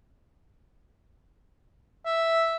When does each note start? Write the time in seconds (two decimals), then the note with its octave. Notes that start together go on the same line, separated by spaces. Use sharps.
2.05 E5